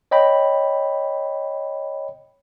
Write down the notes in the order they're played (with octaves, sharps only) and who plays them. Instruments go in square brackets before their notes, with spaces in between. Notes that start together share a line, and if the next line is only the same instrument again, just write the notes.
[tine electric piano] C#5 D#5 G5 B5